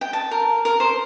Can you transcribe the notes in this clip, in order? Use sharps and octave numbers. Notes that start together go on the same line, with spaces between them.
G5
A5
A#4
A#4
C5